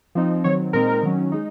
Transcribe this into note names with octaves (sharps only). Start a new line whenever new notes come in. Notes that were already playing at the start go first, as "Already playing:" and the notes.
F3 C4 D#4
D#3 F#3 C4 C#5
A#2 G#3 C4 D#4 A#4
D#3 F#3 C#4
G#3 D#4